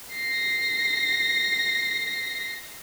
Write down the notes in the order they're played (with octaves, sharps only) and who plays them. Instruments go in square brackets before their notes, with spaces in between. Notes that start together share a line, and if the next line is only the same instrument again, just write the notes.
[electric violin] A#6 C7